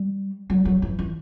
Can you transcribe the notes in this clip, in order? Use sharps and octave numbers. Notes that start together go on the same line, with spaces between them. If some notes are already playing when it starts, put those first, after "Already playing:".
Already playing: G3
F#3
F#3
E3
E3